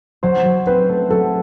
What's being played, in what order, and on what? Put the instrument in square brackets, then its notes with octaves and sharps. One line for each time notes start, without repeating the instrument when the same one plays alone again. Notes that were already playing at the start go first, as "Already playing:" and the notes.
[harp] F#3 [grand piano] C5
[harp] F#3
[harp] C4 [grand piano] B4
[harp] A3
[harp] F#3 [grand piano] A4